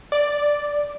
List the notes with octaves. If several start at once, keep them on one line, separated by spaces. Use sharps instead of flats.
D5